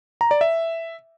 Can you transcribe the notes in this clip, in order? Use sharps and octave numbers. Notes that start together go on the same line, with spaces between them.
A#5
D5
E5